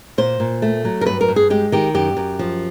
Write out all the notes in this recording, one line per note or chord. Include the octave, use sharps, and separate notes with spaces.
A#2 C5
A#2
A3
F#3
A#4
G2 B4
A#4
G2
G#4
G#3 G4
D#3 G4
F#2 G4
F#2
F3